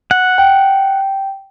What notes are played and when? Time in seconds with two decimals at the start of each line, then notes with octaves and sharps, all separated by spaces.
0.11 F#5
0.38 G5